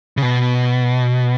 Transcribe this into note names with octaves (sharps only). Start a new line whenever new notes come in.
C#3
B2